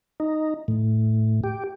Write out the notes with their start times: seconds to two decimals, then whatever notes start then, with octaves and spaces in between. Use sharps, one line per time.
0.20 D#4
0.68 A2
1.44 G4